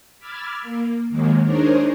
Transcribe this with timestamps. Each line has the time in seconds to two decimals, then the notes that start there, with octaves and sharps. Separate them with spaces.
0.19 B5 D6 E6 F6 G#6 A6
0.62 A#3
1.09 D#2 D#3 F#3 G#3 A#3
1.42 D4 D#4 G#4 A#4 C5 C#5